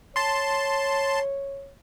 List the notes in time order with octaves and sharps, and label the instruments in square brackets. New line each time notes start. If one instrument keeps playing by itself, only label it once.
[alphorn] C#5 [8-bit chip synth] A5 C6